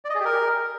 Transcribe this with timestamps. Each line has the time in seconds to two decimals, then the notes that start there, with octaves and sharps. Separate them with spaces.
0.05 D5
0.10 D#5
0.15 G#4
0.20 G4
0.25 A#4